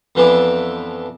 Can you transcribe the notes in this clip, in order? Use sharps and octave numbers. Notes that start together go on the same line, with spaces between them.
F2 E3 F3 B3 D4 E4